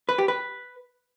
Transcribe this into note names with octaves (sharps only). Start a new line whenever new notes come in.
B4
G4
B4